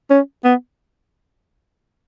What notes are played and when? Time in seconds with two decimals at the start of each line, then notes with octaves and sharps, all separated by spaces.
0.11 C#4
0.44 B3